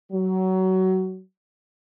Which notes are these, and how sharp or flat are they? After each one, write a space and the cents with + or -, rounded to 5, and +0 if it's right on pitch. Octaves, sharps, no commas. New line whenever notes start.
F#3 +20